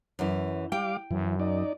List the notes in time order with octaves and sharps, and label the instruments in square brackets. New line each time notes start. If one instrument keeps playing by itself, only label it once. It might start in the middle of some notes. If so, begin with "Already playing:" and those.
[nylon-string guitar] F#2 E3
[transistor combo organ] G3 F5 D6 [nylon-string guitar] G5
[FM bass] F#2 [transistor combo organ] E3
[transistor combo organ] D#4 D5